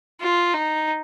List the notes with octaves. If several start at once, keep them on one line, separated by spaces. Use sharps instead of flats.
F4
D#4